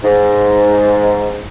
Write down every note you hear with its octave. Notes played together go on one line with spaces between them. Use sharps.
G#2